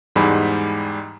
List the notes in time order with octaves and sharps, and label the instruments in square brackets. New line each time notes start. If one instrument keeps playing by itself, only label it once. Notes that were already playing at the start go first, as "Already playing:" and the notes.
[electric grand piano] E2 G#2 G3 G#3 G#5 B5